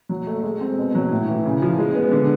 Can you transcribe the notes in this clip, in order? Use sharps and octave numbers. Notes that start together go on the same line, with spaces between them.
F#3
A3
G#3
C4
B2
F#3
A2
E3
C#3
F3
G#3
B3
D3